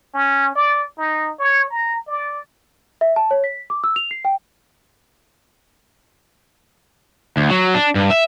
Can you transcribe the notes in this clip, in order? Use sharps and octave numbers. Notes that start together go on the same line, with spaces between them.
C#4
D5
D#4
C#5
A#5
D5
E5
A5
C#5
B6
D6
E6
F7
C7
G5
D2
F#3
D4
G2
E5